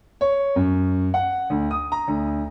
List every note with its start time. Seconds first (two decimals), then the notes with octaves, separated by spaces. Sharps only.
0.21 C#5
0.56 F#2
1.14 F#5
1.50 D2
1.71 D#6
1.92 A#5
2.08 D2